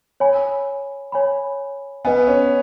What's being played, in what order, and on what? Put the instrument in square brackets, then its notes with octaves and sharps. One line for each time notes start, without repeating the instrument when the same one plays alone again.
[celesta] C#5 G#5 B5
C#5 G#5 B5
[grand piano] B3 [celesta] B4 D#5 G#5
[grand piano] C#4